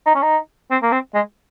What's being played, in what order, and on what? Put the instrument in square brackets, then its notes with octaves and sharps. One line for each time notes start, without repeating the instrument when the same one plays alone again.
[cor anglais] D#4
C#4
D#4
C4
A#3
C4
G#3